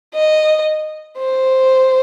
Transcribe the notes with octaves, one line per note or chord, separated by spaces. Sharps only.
D#5
C5